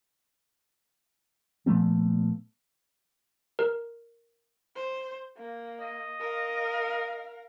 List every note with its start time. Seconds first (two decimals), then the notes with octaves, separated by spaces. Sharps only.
1.66 A#2 F3 A3 B3
3.59 A#4
4.76 C5
5.38 A#3
5.81 D#5
6.20 A#4 F5